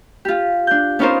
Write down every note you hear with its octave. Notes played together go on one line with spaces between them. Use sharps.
F4 G4
D4 G6
B3 C#4 D#4 F4 A#4 C5